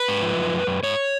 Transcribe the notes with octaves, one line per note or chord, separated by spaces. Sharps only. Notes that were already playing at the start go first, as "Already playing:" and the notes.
Already playing: B4
G#2
F3
F#2
F#2
F#2
G#2 C#5